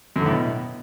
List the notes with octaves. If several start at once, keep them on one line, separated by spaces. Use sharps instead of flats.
F#2
D3
A2
B2